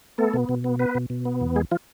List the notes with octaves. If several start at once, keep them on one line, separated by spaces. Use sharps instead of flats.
A3 B3 A4
B2
B2
B3
B3 B4
B2
B2
B3
E2
G#3 G#4
F3 F4